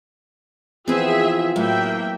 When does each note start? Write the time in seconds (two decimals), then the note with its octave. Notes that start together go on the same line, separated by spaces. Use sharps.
0.88 E3 F3 B3 C4 F4 G#4 E5
1.56 A2 F#3 A#3 E5 G5